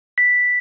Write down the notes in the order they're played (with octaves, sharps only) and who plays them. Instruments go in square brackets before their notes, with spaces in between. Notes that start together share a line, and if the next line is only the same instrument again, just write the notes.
[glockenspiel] B6